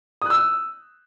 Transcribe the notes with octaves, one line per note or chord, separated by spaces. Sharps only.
D#6 E6 F#6